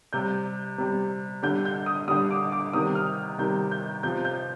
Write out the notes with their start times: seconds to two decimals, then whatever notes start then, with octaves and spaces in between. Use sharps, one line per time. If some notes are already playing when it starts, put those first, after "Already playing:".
0.13 C3 G3 G6
0.78 C3 G3
1.43 D3 G3 G6
1.65 G6
1.86 D#6
2.08 D3 G3 D#6
2.31 D6
2.52 D6
2.73 C3 D#3 G3 D#6
2.95 F6
3.38 C3 D#3 G3 G6
3.71 G6
4.03 C3 F3 G6
4.25 G6